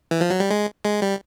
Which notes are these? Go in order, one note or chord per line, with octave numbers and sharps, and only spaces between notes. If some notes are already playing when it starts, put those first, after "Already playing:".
E3
F3
F#3
G3
G#3
G#3
G3